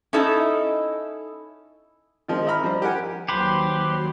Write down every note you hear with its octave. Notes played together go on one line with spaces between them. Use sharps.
C#4 D#4 E4 A4 D#5
D#3 F3 G#3 C4 D#4
D#5 E5 A#5 B5 F6
F3 G3 C5
G4 A#4 F#5 G#5
D#2 F#3 G4 B4 C5 C6